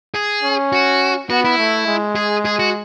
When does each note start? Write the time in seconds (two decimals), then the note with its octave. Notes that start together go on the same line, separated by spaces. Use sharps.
0.15 G#4
0.43 C#4
0.73 F#4
1.29 B3 F#4
1.45 E4
1.58 A3
1.87 G#3
2.16 G#4
2.45 G#4
2.59 F#4